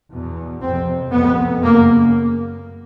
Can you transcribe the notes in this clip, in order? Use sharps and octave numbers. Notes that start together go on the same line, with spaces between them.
E2 B2
F2 C3 C4
F2 C3 B3
F#2 C#3 A#3